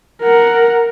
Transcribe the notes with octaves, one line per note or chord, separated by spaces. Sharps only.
A#4 F#5